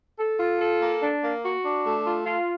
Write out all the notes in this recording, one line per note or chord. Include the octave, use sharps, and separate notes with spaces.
A4
F4
A4
A#3
D4
A#3
F#4
D4
A3
F4
F4